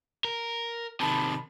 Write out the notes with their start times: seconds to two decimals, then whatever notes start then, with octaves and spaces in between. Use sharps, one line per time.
0.24 A#4
1.00 C3 D#3 A5 B5